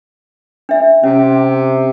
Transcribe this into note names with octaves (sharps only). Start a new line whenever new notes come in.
D4 E5
C3 C#4